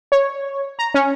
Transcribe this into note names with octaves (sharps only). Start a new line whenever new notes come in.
C#5
A#5
C#4